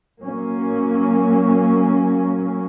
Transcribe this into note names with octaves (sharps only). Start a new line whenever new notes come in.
F#3 A#3 C#4